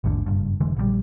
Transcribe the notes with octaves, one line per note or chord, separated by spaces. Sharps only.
A1 E2 G#2 D3
F#1 G2
F1 D3 E3 G#3
A#1 D3 G3